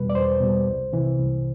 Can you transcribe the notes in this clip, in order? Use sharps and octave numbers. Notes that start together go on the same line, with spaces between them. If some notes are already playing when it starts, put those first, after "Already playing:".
Already playing: E2 B2 G3 B4
D5
E2 C5
B2 G3
C2
C3 E3
C2